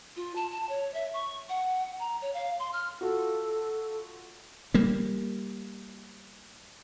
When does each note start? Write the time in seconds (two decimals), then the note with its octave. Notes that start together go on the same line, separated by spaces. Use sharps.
0.16 F4
0.36 A5
0.51 A5
0.69 C#5
0.94 E5
1.14 C#6
1.49 F#5
2.00 A#5
2.22 C#5
2.34 F5
2.59 C6
2.73 F6
3.01 F4 F#4 A4
4.74 G3 A#3